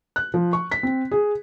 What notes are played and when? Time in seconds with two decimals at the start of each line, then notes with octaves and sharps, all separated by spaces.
0.16 F#6
0.34 F3
0.53 C#6
0.71 B6
0.83 C4
1.11 G#4